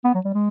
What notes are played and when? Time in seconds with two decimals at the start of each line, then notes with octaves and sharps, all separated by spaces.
0.04 B3
0.14 F#3
0.25 G3
0.34 G#3